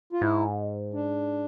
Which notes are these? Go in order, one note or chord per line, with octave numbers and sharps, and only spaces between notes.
F4
G#2 E4
D4